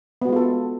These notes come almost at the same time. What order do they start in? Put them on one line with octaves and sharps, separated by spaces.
B3 F#4 G#3 F4 A4